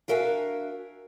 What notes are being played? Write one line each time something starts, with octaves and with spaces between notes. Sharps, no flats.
D4 F#4 A#4 E5 F5 G#5